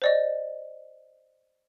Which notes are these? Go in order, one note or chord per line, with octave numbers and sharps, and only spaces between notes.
C5 D5 D#5